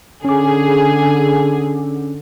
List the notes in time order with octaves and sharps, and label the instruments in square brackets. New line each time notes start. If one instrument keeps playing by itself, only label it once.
[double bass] D3 [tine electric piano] C#4 D6 [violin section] G#4